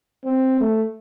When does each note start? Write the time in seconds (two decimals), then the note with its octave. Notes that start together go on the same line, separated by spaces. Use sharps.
0.24 C4
0.60 A3